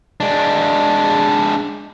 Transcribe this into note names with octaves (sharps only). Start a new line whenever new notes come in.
G#3 D4